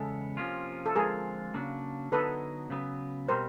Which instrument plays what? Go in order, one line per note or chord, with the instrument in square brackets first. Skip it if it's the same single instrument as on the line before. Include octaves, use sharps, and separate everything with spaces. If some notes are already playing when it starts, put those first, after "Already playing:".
Already playing: [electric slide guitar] E2 C#3 G#3 B3 [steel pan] A4
[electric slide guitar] C3 F3 A#3 C#4 F4
[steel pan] A4
[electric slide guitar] D3 F3 G#3 C4 F4 [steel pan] G#4 A#4
[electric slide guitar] C#3 F#3 A#3 D4
[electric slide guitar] D3 F#3 B3 D#4 [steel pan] A4 B4
[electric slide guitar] C#3 F#3 B3
[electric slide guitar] B2 G3 C4 [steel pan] A#4 C5